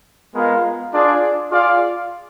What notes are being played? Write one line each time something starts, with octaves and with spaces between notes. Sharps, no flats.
G#3 B3 F4 A#4 F5
D4 F4 G#4 D5
F4 G#4 D5 F5